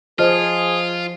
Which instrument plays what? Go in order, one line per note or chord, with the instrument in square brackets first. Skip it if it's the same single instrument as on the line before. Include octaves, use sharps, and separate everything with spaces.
[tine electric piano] F3 [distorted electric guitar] F4 [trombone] G#4 [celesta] C5 D#5 F6